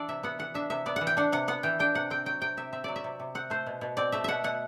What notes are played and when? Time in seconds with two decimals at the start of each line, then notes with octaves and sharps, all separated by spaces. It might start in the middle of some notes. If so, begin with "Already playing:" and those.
Already playing: E3 D4 A4 D5
0.08 C3 E5
0.23 B3 F#5
0.39 E3 F#5
0.54 D4 E5
0.70 C3 E5
0.86 B3 D5
0.96 F#5
1.01 E3
1.07 G5
1.17 D4 F#5
1.32 C3 F#5
1.48 B3 F#5
1.63 E3 G5
1.79 D4 G5
1.95 C3 F#5
2.10 C4 G5
2.26 F#3 G5
2.41 C3 G5
2.57 C3 E5
2.73 C4 E5
2.84 F#3 D5
2.96 E5
3.04 C3
3.20 C3
3.35 C4 F#5
3.50 A3 C5
3.66 B2
3.81 B2
3.97 C4 D5
4.12 A3 E5
4.24 B2 E5 F#5
4.44 B2 F#5